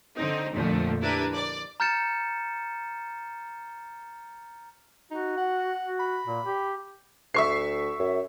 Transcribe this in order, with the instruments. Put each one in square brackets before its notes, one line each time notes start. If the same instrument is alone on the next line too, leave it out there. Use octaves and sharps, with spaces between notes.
[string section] D3 C4 D#4
F2 A#2 D3 F3 A3
D4 E4 G4 A#4 B4
D5
[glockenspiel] A#5 F6 G6 A6 C#7 E7
[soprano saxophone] D#4 [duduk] F#4
[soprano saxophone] F#5
[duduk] F#4
[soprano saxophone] B5
[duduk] A#2
G4
[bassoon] D2 [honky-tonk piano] E5 C#6 C7
[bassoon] F#2